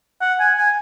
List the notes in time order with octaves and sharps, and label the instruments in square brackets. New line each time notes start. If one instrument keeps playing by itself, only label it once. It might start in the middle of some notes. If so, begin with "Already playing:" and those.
[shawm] F#5
G#5
G#5